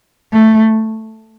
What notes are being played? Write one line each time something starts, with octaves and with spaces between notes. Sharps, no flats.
A3